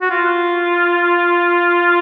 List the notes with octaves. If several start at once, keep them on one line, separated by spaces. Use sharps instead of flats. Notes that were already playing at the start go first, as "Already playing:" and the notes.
F#4
F4